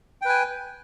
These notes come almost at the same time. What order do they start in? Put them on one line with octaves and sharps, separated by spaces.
G5 B4 G#5